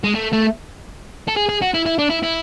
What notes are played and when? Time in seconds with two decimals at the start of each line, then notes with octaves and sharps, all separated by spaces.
0.04 G#3
0.15 A3
0.33 A3
1.28 A4
1.37 G#4
1.49 G#4
1.62 F#4
1.74 E4
1.85 E4
1.98 D4
2.09 E4
2.22 E4